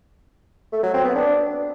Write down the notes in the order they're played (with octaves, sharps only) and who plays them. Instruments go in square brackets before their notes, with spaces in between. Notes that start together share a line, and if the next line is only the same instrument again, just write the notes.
[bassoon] A3
F#3
C4
B3
D4